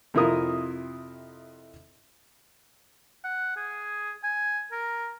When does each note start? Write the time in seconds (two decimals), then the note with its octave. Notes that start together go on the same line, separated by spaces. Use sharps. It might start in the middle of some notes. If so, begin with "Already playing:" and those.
0.14 F2 C3 E4 F4 A#4 D#6
3.24 F#5
3.57 G#4
4.23 G#5
4.72 A#4